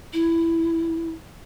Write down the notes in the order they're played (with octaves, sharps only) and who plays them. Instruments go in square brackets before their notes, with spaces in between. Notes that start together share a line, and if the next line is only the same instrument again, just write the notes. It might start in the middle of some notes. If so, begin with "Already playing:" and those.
[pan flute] E4